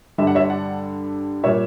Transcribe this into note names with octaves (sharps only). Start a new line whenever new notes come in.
G2 D3 G3 E5
F#5
C#5 E5
D5 F#5
A#2 G3 C#5 E5